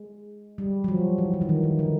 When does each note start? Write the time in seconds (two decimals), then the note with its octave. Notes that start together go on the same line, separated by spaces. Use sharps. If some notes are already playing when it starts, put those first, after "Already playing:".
Already playing: G#3
0.58 G3
0.84 F#3
0.88 F3
1.18 E3
1.34 E3
1.41 D#3
1.49 E3
1.64 D#3
1.79 D3